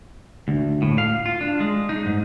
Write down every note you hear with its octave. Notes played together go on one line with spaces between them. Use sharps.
D2
A2
F5
F4
D4
G#3
D#4
G#2